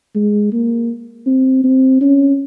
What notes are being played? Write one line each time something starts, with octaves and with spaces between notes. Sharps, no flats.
G#3
A#3
C4
C4
C#4